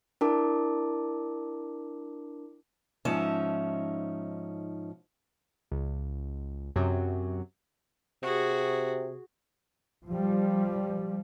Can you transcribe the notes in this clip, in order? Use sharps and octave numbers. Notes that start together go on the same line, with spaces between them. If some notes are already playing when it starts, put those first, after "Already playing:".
D4 E4 A#4 A5 D6
G#2 F3 C#4 D#4 E5 A5
C#2
F#2 C3 F#3
C3 F#4 G#4
F3 G3